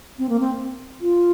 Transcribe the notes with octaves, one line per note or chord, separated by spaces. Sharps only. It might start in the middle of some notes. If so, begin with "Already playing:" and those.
C4
A#3
C4
F4